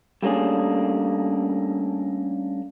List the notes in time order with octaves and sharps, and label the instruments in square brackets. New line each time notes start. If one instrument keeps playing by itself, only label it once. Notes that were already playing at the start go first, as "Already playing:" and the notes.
[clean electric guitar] G3 A3 A#3 C#4 D4 G#4